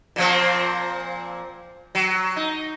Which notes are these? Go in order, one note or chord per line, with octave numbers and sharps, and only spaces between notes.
A#2 F3 C4
F#3
D#4